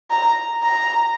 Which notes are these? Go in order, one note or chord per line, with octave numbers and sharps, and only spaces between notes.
A#5
A#5